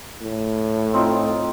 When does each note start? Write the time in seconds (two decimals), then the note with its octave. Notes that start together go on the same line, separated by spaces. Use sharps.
0.21 A2
0.94 C4 D#4 F4